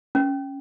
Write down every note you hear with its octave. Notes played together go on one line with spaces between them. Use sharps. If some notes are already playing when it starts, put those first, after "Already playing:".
C#4